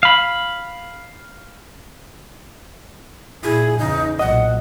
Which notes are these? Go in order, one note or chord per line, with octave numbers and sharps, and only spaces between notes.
F5 B5
A#2 E4 G#4
E2 C#3 D#4
B1 A#2 D#5 F#5